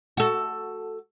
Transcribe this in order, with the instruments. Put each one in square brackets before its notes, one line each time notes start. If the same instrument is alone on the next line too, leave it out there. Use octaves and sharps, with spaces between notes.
[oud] F#4 A4